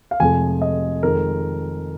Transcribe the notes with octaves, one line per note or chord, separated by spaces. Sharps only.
F5
F1 F2 C3 F3 G#3 G#5
D#5
F2 D#3 G#3 A#4